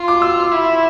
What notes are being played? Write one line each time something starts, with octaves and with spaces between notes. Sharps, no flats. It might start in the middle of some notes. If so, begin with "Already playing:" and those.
Already playing: F4 C6
D6
E6
E4